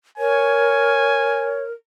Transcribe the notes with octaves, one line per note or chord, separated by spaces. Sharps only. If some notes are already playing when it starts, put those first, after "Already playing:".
A#4 C#5 G#5